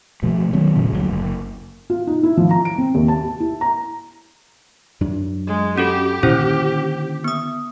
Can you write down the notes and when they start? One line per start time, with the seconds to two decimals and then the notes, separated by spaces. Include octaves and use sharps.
0.22 B2 F3 A3
0.53 D#3 F#3 B3 C#4
0.76 F1 A#2 C#3
0.91 F#1 D2 A2 F#3
1.10 F#1
1.90 F4
2.07 D#4
2.23 E4
2.37 F3
2.51 A#5
2.65 D7
2.78 C4
2.94 D#2
3.08 A5
3.23 G4
3.40 E4
3.61 A#5
5.01 F#2 F#3 D4
5.47 G#3
5.78 C#4 F#4 G4 A4
6.23 A#2 D3 D#3 C#4 E4 C5
7.24 B3 D#6